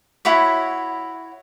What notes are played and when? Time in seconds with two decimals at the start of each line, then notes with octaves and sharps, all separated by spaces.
0.25 E4 F#4 C#5 E5